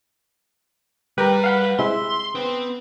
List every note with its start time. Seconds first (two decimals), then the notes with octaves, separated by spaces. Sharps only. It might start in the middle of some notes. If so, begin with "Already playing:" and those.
1.18 G3 G4 A#4 B4
1.44 F5 F#5 B5
1.79 C3 G#3 E4 E5 C6
2.35 B3 C4